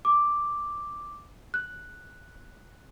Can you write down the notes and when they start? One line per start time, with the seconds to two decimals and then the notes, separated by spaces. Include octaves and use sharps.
0.05 D6
1.54 F#6